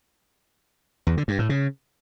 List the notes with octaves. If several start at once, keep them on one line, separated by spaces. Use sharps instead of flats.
E2
D3
G2
A2
C#3